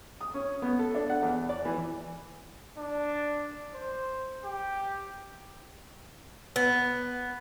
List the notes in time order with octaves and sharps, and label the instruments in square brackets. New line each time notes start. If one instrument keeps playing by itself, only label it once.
[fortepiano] D#6
C#4
B3
A4
D4
F#5
E2
D5
E3
[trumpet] D4
C5
G4
[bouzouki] B3